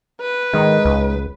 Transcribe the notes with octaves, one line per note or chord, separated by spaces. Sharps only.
B4
D#3 G#3 D#4
C#2